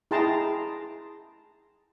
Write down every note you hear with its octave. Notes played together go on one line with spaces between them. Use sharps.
E4 G#4 G5 A5 A#5 C6